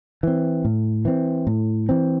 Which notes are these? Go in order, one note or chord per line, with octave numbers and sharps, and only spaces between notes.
E3 C4
A2
E3 C4
A2
E3 C4